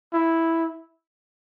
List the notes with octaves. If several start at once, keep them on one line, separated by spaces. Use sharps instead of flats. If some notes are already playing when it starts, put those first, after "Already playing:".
E4